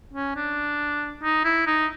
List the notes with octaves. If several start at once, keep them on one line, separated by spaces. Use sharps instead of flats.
C#4
D4
D#4
E4
D#4